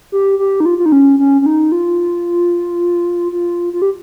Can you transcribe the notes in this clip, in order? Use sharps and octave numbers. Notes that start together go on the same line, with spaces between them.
G4
G4
D#4
F4
F4
D#4
C#4
C#4
C#4
D#4
F4
F4
F4
G4